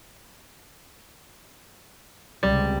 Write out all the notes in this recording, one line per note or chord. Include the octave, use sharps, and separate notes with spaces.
C#2 C3 G3